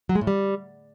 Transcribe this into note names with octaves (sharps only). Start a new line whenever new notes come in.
F#3
G#3
A2
G3